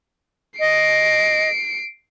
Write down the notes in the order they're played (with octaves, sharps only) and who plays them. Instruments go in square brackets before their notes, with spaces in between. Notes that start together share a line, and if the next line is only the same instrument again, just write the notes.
[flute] D#5 [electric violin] C7 D7